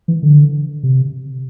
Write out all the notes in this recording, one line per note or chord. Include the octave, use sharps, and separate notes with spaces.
E3
D3
C3